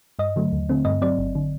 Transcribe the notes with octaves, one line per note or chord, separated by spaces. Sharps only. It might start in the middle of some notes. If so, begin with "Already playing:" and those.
G2 D#5
D3 F#3 A3
D#2
D3 A3 C4
G2 D#5
F#3 C4 D5
G1
D3